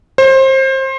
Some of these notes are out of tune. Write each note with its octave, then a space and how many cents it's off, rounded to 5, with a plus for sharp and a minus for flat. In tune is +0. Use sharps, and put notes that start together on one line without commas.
C5 +25